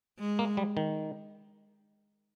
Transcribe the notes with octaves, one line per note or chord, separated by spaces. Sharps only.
G#3
A#3
G3
D#3